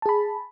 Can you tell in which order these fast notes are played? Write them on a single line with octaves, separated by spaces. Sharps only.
A5 G#4 B5